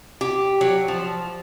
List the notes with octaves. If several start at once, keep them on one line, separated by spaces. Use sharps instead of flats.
G4
F#3
F3